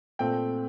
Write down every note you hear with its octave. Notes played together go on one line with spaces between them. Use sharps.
A#2 A3 C4 G5